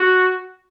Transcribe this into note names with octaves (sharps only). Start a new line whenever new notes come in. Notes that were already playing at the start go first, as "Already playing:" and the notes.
Already playing: F#4